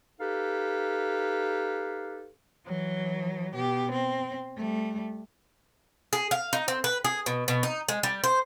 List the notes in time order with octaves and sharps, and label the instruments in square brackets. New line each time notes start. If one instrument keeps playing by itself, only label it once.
[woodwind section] D#4 G4 A4 B4 F5
[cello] E3 F#3
B2 G4
C4
G3 A3
[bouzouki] G#4
F5
D#4
C4
B4
G#4
B2
B2
D#4
G#3
G3
C5